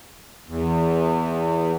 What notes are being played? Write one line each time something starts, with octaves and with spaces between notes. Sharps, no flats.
E2